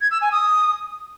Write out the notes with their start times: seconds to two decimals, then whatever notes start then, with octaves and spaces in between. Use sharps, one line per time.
0.01 G#6
0.11 E6
0.21 G#5
0.32 D#6